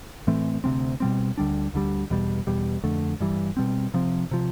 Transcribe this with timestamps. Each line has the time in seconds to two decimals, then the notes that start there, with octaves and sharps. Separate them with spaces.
0.27 A2 E3 A3 C4
0.64 D2 C3 G3 C4
1.00 B2 G3 C4
1.37 D2 D3 G3 D4
1.74 D2 D3 G3
2.10 E2 B2 G3
2.47 E2 B2 G3
2.84 F2 D3 A3
3.20 G2 E3 G3
3.57 B2 G3 C4
3.94 C3 F3 C4
4.31 C3 F3